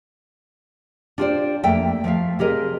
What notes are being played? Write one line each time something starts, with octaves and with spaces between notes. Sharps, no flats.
D4 F4 G4 A#4 C5 D5
F2 A3 A#3 E5 G5
F3 A3 E5 F5
C3 G4 G#4 A#4 D#5